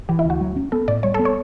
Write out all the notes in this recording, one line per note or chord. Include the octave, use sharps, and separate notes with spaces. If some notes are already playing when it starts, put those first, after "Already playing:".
E3 G4
E4
D2
F#4
F#3
C#4
B3 A4
A2 D5
G3 C#5
A4
B3
C#5